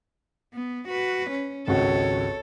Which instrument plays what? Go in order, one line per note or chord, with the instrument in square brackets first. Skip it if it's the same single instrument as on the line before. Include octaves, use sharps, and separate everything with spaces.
[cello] B3
F#4 B4
C#4
[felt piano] G#1 C#2 F#4 [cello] A4 C#5